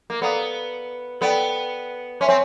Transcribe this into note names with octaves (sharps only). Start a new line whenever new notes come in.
A#3
B3 A4 D5 F5 A#5 D#6
B3 A4 D5 G5 B5
C#4 E5 G#5 C6
C4